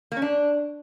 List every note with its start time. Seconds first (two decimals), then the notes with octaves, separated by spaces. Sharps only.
0.12 A#3
0.17 C#4
0.22 D4